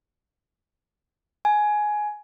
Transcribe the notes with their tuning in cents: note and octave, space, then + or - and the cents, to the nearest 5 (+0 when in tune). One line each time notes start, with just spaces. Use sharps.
G#5 +15